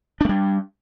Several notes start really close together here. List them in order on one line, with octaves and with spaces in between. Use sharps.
D4 A3 G3